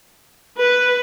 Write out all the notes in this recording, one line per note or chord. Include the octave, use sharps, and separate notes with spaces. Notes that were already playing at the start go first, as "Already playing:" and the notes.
B4